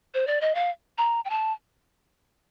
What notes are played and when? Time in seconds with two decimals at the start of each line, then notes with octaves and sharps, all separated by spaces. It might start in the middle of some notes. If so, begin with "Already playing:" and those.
0.14 C5
0.27 D5
0.41 D#5
0.55 F5
0.98 A#5
1.25 G5
1.30 A5